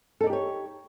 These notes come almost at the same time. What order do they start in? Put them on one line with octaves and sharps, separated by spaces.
A4 D#4 D5 G4 C#5